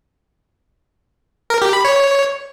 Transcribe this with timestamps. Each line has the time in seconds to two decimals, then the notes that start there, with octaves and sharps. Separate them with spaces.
1.50 A#4
1.62 G4
1.73 B5
1.85 C#5